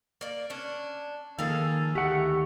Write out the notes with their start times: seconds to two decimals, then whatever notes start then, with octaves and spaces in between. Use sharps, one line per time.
0.21 A#3 D5
0.50 C#4 D4
1.39 D#3 F3 A#3 G#4 A4 F5
1.95 D2 D#3 A3 F#4 G4 F#5